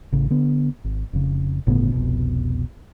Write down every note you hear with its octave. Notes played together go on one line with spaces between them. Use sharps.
A1 C#3
D3 B3
G#1
F1 C#3
G1 A2 C#3 B3
F1 C2 B2